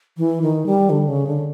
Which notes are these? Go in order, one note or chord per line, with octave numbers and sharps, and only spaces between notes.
E3
D#3
G3
D3
C#3
D3